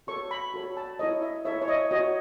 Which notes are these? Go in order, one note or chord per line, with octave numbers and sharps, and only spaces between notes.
F#4 A4 C#5 C#6
B5
F#4 A4 C#5
A5
E4 A4 C#5 D#5
E5
E4 A4 C#5 E5
C#5
D#5
F#4 C#5 D#5